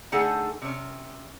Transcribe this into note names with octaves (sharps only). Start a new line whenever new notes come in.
D3 A3 D#4 G#4 A4 F#5
C3 C#4